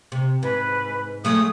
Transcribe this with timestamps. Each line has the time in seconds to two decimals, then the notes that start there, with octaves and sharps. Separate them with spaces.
0.12 C3
0.43 G#2 B4
1.25 F#3 G#3 A3 D#6